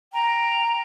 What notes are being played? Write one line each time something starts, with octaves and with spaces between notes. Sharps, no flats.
G5 A#5